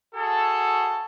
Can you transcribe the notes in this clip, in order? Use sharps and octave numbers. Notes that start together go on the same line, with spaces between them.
F#4 G#4 A4